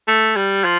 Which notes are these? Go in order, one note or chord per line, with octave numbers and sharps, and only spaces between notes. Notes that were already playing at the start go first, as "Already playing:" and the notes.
A3
G3
F3